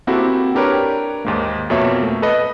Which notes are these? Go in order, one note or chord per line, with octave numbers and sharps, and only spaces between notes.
A#3 C4 E4 F#4 G4 A4
D4 G4 A#4 B4 C#5
D#2 G#2 A#3
F2 B2 A#3 C#5 E5 E6
A3
A4 B4 D#5